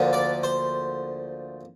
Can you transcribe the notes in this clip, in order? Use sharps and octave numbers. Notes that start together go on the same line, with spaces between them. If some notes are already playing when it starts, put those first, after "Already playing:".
Already playing: D2 D3 F3 A#3
D5
C5